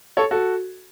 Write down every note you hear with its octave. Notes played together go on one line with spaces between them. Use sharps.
A4 C#5
F#4 A4